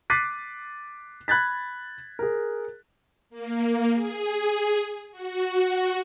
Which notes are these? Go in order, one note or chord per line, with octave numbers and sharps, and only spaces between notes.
D6 F#6 A6 B6 C7 D#7
B5 F#6 G#6 A6 B6
G#4 A#4
A#3
G#4
F#4